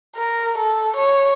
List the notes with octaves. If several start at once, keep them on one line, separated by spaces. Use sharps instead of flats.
A#4
A4
C#5